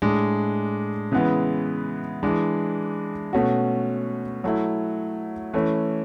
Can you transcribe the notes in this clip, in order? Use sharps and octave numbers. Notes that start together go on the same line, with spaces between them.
A2 G#3 D4
C#3 E3 G#3 B3
E3 G#3 D4
B2 A3 C#4 F#4
F#3 A3 E4
E3 A3 C#4